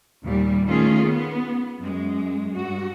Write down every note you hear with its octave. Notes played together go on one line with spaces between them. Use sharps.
D#2 A#2 G3
D#3 A3 C#4 F4 G#4
B3
F#2 G#3
G2 F#4